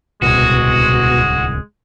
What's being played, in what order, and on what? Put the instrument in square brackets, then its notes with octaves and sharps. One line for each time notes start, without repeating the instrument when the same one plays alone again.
[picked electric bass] D1 C2 [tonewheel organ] B2 [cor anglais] G#3 [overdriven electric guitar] F#4